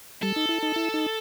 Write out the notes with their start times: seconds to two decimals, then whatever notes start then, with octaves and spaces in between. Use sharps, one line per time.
0.22 G3 A4
0.36 D#4
0.49 E4
0.63 D#4
0.76 E4
0.94 D#4